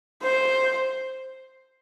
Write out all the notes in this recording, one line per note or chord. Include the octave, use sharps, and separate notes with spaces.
C5